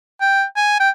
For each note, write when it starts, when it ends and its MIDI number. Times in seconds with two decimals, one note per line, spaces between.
0.21 0.44 79
0.56 0.78 80
0.80 0.90 79